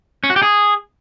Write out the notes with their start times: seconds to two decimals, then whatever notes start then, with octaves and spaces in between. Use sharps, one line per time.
0.24 C#4
0.30 F#4
0.36 G4
0.42 G#4